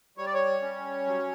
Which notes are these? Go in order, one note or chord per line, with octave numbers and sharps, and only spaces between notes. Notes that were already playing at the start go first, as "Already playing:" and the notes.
G3 C#5
D5
C#5
C#4
F#3